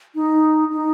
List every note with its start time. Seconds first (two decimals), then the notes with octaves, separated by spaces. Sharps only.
0.15 D#4
0.71 D#4